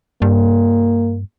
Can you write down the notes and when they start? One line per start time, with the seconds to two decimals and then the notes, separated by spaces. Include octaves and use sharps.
0.22 G2 A#3